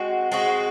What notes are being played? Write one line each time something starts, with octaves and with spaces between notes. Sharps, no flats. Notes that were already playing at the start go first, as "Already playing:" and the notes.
Already playing: G#3 C4 F#4
G#3 C4 F#4